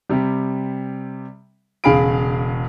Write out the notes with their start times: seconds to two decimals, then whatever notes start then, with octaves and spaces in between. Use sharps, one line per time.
0.10 C3 G3
1.84 E1 C#3 G#4 F5 B5 D7